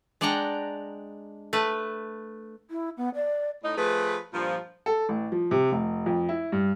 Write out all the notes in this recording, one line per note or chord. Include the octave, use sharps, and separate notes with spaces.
G#3 D4 D5 F#5 G5 A#5
A3 B4
E4
B3
D5
A2 D#4
F3 A3 G#4 B4
G2 A#2 F3
A4
A1
F3
C3
F1
F2
E4
G2